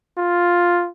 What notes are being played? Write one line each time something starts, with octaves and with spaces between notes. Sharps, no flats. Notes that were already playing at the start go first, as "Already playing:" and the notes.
F4